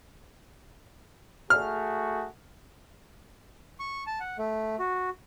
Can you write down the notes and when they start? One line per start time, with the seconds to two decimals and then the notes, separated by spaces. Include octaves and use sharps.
1.50 A3 F#4 G#4 F6
3.80 C#6
4.06 A5
4.20 F#5
4.38 A3
4.79 F#4